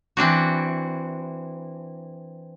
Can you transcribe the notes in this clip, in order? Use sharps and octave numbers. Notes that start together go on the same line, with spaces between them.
E3 C4 D4 F#4